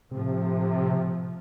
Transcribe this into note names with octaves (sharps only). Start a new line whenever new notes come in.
A2 C3 F3